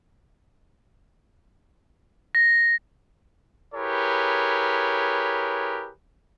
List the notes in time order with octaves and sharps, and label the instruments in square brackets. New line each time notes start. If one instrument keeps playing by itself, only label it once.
[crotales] A#6
[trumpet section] E4 G4 G#4 A#4 B4 C#5